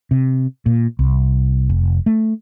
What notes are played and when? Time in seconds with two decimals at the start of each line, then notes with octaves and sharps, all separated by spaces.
0.11 C3
0.66 A#2
0.99 C2
1.69 F1
2.06 A3